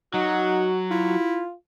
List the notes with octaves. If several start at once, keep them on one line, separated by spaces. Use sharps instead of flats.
F#3 D#4 F#4 F#5
E4 F4